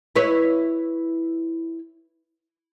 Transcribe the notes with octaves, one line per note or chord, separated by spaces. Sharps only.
E4 B4 C#5